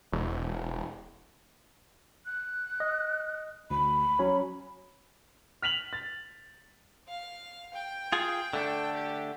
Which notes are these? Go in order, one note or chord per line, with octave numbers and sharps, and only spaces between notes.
E1
F#6
D#5
D2 B5
F#3 C#4 C#5
F6 B6 F7 F#7
A6
F5
G5
F4 G#4
D3 A3 D4
G4